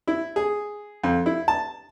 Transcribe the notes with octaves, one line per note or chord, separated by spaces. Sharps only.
E4
G#4
F2
E4
A5